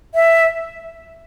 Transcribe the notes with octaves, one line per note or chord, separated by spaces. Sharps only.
E5